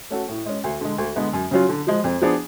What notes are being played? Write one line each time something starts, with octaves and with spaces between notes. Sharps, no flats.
A3 C#4 F#4 A4
A2
G#3 C#4
D2
D3 G#3
D2
D3 G#3 B3
F#2
C#3 F#3 C#4 F4
D3
F3 G#3
F2
F3 B3 D4 G#4